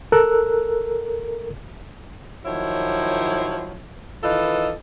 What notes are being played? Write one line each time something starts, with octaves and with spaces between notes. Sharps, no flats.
A4 A#4 E6 F#6
D#3 F3 F#3 E4 C#5
D#3 E3 F4 A4 B4 D#5